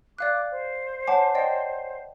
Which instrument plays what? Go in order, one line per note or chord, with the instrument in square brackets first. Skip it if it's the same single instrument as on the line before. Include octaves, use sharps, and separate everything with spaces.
[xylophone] D5 F5 F#6 [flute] D6
[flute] C5
[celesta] C#5 F#5 G#5 [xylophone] A5 D6
[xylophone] D5 D#5 G5